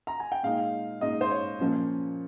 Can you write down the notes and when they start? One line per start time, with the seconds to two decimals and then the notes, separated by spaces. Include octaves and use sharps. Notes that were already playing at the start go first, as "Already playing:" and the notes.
0.07 A#5
0.20 G#5
0.32 G5
0.43 A#2 G#3 D#4 F5
1.01 A#2 G#3 D#4 D#5
1.21 C5
1.31 C#5
1.59 A#2 F3 A#3 C#4